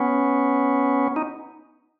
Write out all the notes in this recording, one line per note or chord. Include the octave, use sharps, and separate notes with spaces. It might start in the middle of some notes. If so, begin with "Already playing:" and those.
Already playing: B3 C#4
D#4